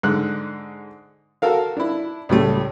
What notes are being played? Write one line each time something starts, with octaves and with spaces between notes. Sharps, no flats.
G#2 D3 F#6
F#4 A4 A#4 F5
D4 E4
C#2 A2 G3 A3